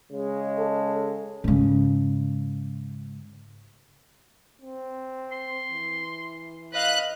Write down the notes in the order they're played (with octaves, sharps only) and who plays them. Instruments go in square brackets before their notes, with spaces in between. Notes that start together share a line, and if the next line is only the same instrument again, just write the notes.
[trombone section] C#3 G#3
[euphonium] A4
[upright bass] G#2 C#3
[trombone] C4
[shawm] C6
[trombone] E3
[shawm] B4 [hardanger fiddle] D#5 F5 [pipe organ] F#6